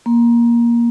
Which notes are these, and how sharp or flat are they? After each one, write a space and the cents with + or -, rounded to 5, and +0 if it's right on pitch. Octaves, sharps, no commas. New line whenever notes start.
A#3 +15